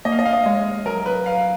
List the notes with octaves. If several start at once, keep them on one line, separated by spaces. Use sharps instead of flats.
A#3 D#5
F5
D#5
F5
D#5
G#3 C#5
F#3 A#4
B4
F5